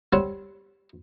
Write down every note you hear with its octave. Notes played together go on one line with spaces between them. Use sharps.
G3 C4 C#5 F#5